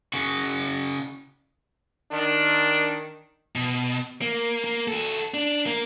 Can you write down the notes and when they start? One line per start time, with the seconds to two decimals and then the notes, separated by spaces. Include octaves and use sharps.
0.14 C#3 F#4
2.12 D#3 D4
3.55 B2
4.22 A#3
4.64 A#3
4.88 F#4 A4
5.34 D4
5.67 A#3